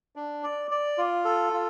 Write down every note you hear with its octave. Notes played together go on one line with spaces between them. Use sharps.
D4
D5
D5
F4
A4
F4